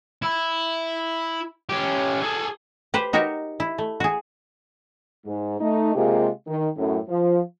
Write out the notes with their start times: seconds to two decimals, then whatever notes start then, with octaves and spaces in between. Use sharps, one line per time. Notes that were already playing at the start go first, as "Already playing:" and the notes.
0.22 E4
1.69 C#4 G4
2.22 G#4 A4
2.94 G4 B4 C5
3.13 D#4 F#4 G4 A#4 C#5
3.60 E4
3.78 A3
4.00 F#4 G#4
5.25 G#2
5.60 A3 D#4
5.95 C3 G#3 A#3 F4 G4 G#4
6.47 D#3
6.76 F#2 A2
7.08 F3